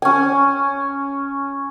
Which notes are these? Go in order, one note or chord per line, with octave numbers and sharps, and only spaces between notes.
C#4 G#5